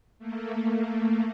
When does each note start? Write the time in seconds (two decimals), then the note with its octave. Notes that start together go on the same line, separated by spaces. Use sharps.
0.19 A3 A#3